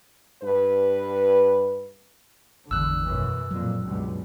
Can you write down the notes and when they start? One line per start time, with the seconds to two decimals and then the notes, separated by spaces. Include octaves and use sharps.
0.43 G2 B4
2.71 G#1 E2 D3 E6 F#6
3.05 F#2 B2 E3
3.51 F2 A#2 F#3
3.82 C#2 G2 B2